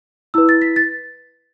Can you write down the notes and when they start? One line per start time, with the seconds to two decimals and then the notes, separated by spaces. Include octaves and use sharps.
0.34 E4 B4 E6
0.49 A6
0.62 B6
0.76 A6